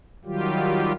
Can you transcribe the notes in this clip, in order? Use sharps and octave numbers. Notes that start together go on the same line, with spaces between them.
D#3 F#3 G3 F4 G4